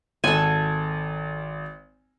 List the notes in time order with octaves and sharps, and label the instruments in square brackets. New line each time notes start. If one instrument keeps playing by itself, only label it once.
[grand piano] G#1 [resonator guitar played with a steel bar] A4 F#5 [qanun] G#5